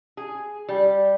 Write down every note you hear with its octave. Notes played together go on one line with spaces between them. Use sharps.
G#4
G3